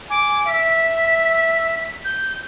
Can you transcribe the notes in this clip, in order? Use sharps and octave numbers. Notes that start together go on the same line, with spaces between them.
G#5 D6
E5 B6
G6